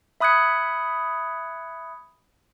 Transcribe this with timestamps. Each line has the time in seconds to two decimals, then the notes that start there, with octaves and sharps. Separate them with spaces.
0.20 E5 B5 D#6 F#6 G#6 C#7